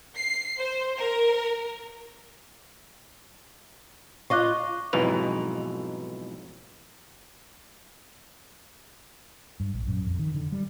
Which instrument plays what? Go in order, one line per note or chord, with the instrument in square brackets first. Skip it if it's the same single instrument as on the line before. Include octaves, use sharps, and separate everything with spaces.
[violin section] C7
C5
A#4
[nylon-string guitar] F4 D#5 F5 [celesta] C#6 D6 F#6
[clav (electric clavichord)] B1 F2 G#2 B2 E3 F5
[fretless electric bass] G2
A#1
F#2
F2
D#3
D3
G3